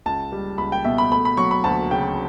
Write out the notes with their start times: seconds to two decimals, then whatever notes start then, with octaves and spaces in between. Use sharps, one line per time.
0.06 C#2 A5
0.32 G3
0.58 C#2 B5
0.72 G5
0.85 B2 E5
0.98 B5
1.12 A3 B5
1.25 B5
1.37 F#3 C#6
1.51 B5
1.64 D2 A5
1.91 C#3 G5